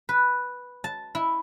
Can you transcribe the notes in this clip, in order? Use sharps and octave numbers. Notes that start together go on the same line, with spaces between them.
B4
A5
E4